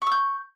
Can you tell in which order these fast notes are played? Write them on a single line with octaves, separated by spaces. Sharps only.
C#6 E6 G6